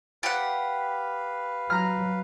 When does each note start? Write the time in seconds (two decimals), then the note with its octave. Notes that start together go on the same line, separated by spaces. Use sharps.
0.23 G4 B4 F5 F#5
1.70 F#3 A#5 F6